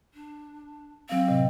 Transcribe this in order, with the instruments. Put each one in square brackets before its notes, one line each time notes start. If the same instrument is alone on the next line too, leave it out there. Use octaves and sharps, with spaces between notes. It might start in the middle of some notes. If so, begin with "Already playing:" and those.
[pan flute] D4
[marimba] F#3 F5 [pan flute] C4
[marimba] A2 C3 D#5